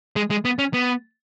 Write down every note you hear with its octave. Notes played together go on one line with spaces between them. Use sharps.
G#3
G#3
B3
C#4
B3